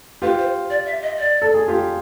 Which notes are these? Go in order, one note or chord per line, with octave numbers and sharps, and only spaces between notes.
F4 G4 B4
C5
D5
E5
D#5
D5
A4
G#4
F4 G4